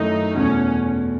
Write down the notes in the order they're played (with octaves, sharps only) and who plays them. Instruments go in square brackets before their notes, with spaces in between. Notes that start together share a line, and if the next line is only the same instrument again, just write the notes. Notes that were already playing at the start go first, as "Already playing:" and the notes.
Already playing: [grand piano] F#2 D#3 A3 E4 [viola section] D#4
[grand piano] E2 B2 A3 [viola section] C#4